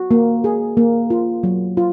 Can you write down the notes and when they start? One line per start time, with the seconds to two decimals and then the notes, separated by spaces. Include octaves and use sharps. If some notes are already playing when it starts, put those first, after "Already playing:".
Already playing: F#4
0.11 A#3
0.44 G#4
0.77 A#3
1.10 F4
1.43 F#3
1.77 F4